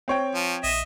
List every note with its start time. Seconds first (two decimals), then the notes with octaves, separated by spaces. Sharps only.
0.08 C4 C#5 G5
0.35 F3
0.64 A#1 D#5 E5